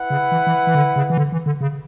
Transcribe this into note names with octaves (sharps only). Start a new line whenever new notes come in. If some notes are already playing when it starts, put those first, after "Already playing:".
Already playing: E4 B4 F#5
C#3
E3
E3
E3
D3
C#3
E3
D3
E3
D3
C#3